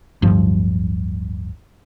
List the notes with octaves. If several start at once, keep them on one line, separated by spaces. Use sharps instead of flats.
D1 G1 G2 F3